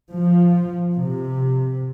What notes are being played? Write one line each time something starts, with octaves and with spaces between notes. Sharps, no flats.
F3
C3